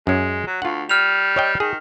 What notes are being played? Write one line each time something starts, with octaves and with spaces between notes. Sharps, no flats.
F#2 G#3 C#4
F#3
D2 F4 F#5
G3 F6 F7
C#5 D#5 G5
D#3 G#4